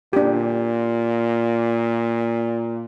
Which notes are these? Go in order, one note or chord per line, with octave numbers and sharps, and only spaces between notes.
A#2 D4 G4